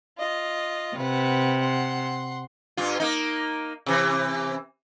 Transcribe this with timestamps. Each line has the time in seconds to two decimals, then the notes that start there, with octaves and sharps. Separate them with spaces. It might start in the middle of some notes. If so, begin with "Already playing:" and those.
0.17 F4 D#5
0.97 C3 B4 F#5
1.61 F#5 C6
2.77 G2 F4
3.00 A#3 D#4
3.86 C3 E3